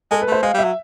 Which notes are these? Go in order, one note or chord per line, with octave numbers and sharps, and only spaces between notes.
G#3 A4
B4
A3 C5
G#3 F5
G3
E5
F#3